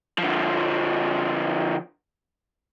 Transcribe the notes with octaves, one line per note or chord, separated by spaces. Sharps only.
D3 F3